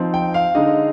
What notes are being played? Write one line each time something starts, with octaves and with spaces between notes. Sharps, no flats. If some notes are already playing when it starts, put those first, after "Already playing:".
Already playing: F3 C4 D#4
G5
F5
D3 G#3 D#4 D#5